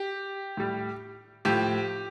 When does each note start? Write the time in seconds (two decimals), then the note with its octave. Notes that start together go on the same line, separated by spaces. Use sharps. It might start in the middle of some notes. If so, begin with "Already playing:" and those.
Already playing: G4
0.57 A2 G3
1.45 A2 F3 G4